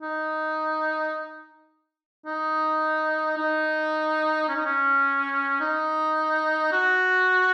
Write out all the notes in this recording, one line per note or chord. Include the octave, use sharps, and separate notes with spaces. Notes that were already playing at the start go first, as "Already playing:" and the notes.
D#4
D#4
D#4
C#4
D#4
C#4
D#4
F#4